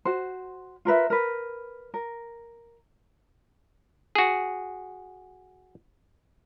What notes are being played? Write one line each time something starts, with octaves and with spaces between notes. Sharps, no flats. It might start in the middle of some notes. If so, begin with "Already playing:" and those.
F#4 C5
F4 A#4 B4 E5
A#4 B4
A#4
F#4 G#4